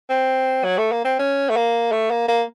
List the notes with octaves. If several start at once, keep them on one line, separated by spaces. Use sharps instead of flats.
C4
F#3
A3
A#3
C4
C#4
A3
A#3
A3
A#3
A#3